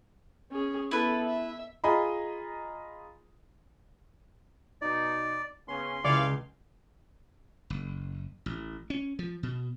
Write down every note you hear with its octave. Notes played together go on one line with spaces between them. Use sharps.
C#4 G#4
B3 E4 A4 B4
E5
F4 G#4 D#5 A#5 B5
B2 D#4 D5
C#3 B3 C#4 C6
C#2 G2 D#3 E4 C#5 D5 F5
F#1
A1
C#4
F3
B2